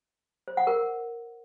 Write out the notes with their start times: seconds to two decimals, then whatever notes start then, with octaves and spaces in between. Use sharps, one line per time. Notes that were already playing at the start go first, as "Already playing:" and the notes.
0.48 C5
0.57 F#5
0.67 A#4